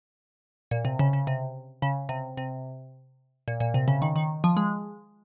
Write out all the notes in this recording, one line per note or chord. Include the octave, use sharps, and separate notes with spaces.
A#2
C3
C#3
C#3
C3
C#3
C3
C3
A#2
A#2
C3
C#3
D#3
D#3
F3
G#3